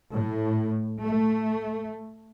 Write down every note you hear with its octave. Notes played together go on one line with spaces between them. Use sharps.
A2
A3